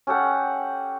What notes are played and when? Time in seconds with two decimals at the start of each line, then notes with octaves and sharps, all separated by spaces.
0.07 C#4 G4 A4 F#5